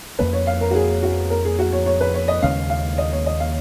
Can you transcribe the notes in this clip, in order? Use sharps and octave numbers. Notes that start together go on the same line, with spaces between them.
F2 F3 A#3 C#4 B4
C#5
F5
A#4
F#4
G#4
F#4
A#4
G#4
F#4
C#5
C#5
B4
C#5
D#5
D#2 C#3 G#3 C#4 F5
F5
D#5
C#5
D#5
F5